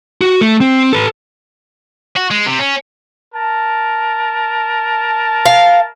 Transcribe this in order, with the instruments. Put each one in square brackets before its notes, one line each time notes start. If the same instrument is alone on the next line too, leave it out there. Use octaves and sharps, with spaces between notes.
[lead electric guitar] F#4
A3
C4
A4 B4
[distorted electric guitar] F#4
G#3
C3
C#4
[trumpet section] A#4 A5
[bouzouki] F5